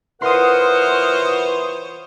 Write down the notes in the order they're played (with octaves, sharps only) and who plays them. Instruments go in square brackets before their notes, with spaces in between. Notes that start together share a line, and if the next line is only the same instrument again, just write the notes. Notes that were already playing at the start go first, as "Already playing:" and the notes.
[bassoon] E3 [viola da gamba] F4 C5 C#5 [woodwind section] A#4 F#5 [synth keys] C6 D#6